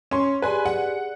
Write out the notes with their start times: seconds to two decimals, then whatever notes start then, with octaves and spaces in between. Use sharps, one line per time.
0.11 C#4 C6
0.42 G4 G#4 B4 D5 G#5 C6
0.66 F#5